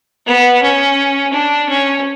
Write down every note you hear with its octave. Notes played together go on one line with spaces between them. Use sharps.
B3
C#4
D4
C#4